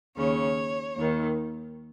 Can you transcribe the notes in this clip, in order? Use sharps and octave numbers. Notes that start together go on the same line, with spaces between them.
D#2 C#3 C#5
D#2 D#3